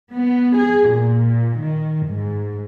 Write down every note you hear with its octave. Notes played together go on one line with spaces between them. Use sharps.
B3
G#4
A#2
D#3
G#2